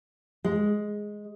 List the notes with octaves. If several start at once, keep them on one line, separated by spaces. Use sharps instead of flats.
G#3